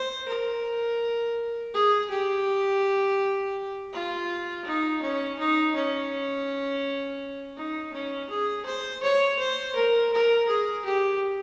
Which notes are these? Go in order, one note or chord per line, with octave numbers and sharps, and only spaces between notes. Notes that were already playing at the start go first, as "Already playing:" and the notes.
Already playing: C5
A#4
G#4
G4
F4
D#4
C#4
D#4
C#4
D#4
C#4
G#4
C5
C#5
C5
A#4
A#4
G#4
G4